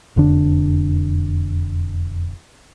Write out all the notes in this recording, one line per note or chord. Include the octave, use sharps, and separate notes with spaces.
E1 F2 D3 D4